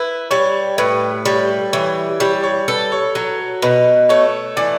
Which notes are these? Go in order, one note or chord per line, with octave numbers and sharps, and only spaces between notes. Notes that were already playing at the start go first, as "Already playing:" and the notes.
Already playing: E4 B4
G3 C#5
A2 B4
G3 C#5
E3 C#5
G3 C#5
C#5
A4 B4
C#5
F#3 C#5
B2 B4
A3 C#5
E3 D5